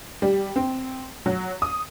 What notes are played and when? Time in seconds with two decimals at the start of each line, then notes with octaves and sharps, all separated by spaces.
0.22 G3
0.56 C4
1.26 F#3
1.62 D#6